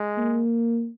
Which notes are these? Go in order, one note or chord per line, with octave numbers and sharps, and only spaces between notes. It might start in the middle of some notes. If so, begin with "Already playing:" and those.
Already playing: G#3
A#3